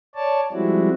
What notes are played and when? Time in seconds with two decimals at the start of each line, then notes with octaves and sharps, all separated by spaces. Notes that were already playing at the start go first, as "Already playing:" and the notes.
0.15 C#5 D5 A5
0.52 F3 G3 G#3 C4 E4 F#4